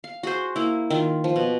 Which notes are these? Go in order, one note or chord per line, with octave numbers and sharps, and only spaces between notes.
F5
F#4 G#4 C5
A#3 E4
D#3 F4
F3
B2